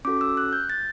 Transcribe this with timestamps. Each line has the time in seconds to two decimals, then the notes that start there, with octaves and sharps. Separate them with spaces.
0.05 C#4 F#4 A4 D6
0.21 E6
0.37 F#6
0.53 G6
0.70 A6